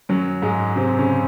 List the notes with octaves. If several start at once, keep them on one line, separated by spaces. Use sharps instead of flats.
F#2 F#3
G#2 G#3
C3 C4
C#3 C#4